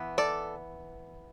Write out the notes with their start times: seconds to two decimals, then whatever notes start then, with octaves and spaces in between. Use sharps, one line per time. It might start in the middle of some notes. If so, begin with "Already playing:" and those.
Already playing: E3 B3
0.18 A4 D5